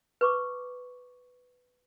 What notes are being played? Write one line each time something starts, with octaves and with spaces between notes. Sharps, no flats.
B4 C#6 D6